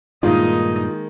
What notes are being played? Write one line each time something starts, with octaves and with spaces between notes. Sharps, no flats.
G2 A#2 D#3 G#3 A#3 D#4 F4 D#5